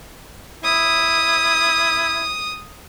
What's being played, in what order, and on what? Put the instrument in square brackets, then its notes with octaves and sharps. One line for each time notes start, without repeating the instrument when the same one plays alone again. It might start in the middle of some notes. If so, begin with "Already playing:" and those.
[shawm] E4 [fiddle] D#6